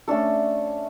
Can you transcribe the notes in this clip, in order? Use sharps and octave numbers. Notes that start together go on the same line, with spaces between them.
A3 C#4 D4 A4